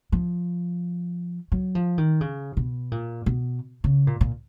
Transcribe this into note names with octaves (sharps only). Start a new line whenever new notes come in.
F3
F#3
F3
D#3
C#3
B2
A#2
B2
C#3
A#2
A#2